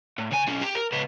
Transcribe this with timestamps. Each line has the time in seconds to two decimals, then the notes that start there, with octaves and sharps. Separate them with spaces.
0.18 A2
0.31 C#3 G#5
0.47 B1 C#4
0.61 G4
0.75 A#4
0.92 C#2 B3